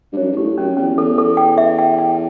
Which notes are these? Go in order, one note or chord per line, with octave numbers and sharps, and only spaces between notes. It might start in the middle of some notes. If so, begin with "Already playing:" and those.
G2
F#2 C#5
G2
A2 G4
F#2 C#4
E2 C#4
E2 A4
A4
G5
E5
G5
G5